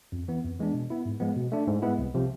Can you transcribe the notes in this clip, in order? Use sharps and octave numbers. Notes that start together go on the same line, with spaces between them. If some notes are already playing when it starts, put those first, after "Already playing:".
F2
E3 B3
F2
E3 G#3 B3 D4
B2
B3 E4
G#2
F3 G#3 B3
B2
A3 D4
G#2
G#3 B3 E4
C2
C3 F3